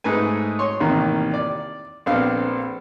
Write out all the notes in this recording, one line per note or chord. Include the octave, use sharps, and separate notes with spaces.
G#2 A3 B4 G#5
C#5 C6
A1 C3 D#3 A#3
D5
A#1 B3 C4 D4 A4 F5